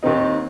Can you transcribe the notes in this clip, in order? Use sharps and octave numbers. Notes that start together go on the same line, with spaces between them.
D#2 D#3 C4 D#4